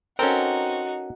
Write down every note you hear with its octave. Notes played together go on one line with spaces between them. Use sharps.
C4 C#4 D#4 F#4 A4 A#4